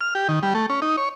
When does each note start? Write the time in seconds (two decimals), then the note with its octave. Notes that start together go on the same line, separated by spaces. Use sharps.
0.01 F6
0.15 G4
0.29 D#3
0.43 G3
0.55 A3
0.70 C#4
0.82 D#4
0.97 C#5